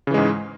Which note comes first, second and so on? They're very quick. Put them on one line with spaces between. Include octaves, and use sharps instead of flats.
C#3 E3 G#3 G#2